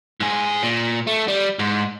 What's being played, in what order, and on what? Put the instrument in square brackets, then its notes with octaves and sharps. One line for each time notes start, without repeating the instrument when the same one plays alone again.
[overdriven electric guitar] G#2 G#4
A#2
A3
G3
G#2